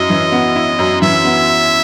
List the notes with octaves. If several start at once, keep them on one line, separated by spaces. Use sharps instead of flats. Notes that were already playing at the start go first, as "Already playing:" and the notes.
Already playing: F#2 E4 D#5
E3
B3
E4
F#2
E3 E5
B3